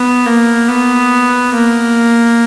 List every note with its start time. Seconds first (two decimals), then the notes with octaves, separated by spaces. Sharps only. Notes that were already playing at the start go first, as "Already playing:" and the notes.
Already playing: B3
0.26 A#3
0.68 B3
1.54 A#3